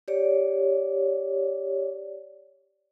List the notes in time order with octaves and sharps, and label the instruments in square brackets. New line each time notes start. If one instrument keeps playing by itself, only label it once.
[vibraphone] G4 C#5 D5